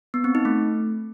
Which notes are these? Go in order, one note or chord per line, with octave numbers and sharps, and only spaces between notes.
B3
C4
D#4
A3